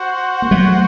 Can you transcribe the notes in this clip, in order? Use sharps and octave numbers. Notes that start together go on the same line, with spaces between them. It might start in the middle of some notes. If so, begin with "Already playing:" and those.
Already playing: F#4 C5 F#5
A#3
F#3 A3